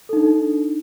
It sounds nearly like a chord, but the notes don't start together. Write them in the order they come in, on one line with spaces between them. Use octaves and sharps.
A4 D#4 D4